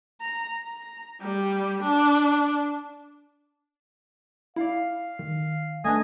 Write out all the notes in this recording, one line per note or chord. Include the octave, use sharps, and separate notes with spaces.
A#5
A#5
G3
D4
E4 D5 F5
D#3
A3 D4 B4 D#5 G#5